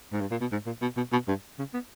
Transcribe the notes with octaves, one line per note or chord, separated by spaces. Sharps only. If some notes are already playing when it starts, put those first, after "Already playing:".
G#2
G2
A#2
B2
G#2
A#2
B2
B2
B2
G2
C#3
B3